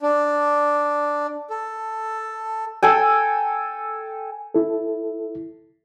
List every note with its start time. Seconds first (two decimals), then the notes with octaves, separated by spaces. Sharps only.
0.01 D4
1.50 A4
2.83 A4 G5 G#5
4.55 E4 A4